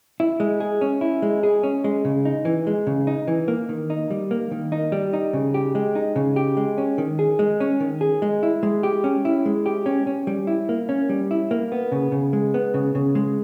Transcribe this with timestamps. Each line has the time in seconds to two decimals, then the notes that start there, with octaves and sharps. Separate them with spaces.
0.20 E4
0.40 G#3
0.60 G#4
0.81 C#4
1.01 E4
1.22 G#3
1.43 G#4
1.63 C#4
1.84 G#3
2.05 C#3
2.25 D#4
2.45 E3
2.67 G#3
2.87 C#3
3.07 D#4
3.28 E3
3.48 A#3
3.69 D#3
3.90 D#4
4.10 G3
4.31 A#3
4.51 D#3
4.72 D#4
4.92 G3
5.13 D#4
5.33 C#3
5.54 G4
5.75 G#3
5.95 D#4
6.16 C#3
6.36 G4
6.57 G#3
6.78 C#4
6.98 D#3
7.19 G#4
7.39 G#3
7.60 C#4
7.80 D#3
8.01 G#4
8.22 G#3
8.43 E4
8.63 G#3
8.83 G4
9.04 C#4
9.25 E4
9.46 G#3
9.66 G4
9.86 C#4
10.07 C#4
10.27 G3
10.47 E4
10.69 A#3
10.89 C#4
11.09 G3
11.31 E4
11.51 A#3
11.72 B3
11.92 C#3
12.12 C#3
12.33 G#3
12.54 B3
12.74 C#3
12.95 C#3
13.15 G#3